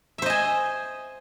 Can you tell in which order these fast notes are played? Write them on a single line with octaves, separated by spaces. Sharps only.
E5 C5 D#5 G#5